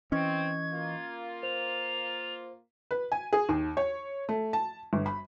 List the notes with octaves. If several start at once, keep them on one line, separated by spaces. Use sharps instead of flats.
E3 C4 C#4 D#5 C#6 G#6
A#3 F4
C5 F7
B4
G#5
G#4
D#2
C#5
A3
A5
G1
B5